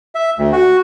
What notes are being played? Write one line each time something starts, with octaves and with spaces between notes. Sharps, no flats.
E5
D2
F#4